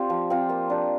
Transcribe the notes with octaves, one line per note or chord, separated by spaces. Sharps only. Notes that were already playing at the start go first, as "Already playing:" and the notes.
Already playing: C4 F4 G4 D5
F3
C4 F4
A#3
D4 G4